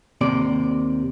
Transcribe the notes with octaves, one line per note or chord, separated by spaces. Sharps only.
D#2 C3 D5